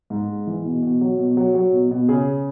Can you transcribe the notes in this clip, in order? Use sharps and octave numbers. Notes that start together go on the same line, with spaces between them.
G#2
G#3
E3
B2
B2
F#3
B2
F#3
F#3
B2
B2
C#3 G#4